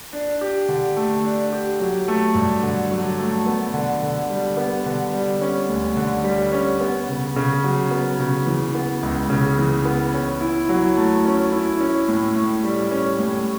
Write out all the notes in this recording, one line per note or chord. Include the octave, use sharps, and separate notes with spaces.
D4
G4
D3
A3
D4
G4
F#3
A3
G2
D3
F#3
A3
B3
D3
D3
G3
B3
D3
G3
C#4
D2
D3
G3
C#4
B3
C#3
C#3
F#3
B3
C#3
E3
B3
C#2
C#3
E3
B3
C#4
E4
F#3
A3
C#4
E4
C#4
A2
A2
G3
C#4
A2